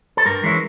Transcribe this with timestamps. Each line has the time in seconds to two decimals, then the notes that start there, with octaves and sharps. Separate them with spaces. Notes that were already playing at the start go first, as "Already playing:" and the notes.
0.17 A4
0.25 G2 A#4
0.43 E3 G#3 C#4 E4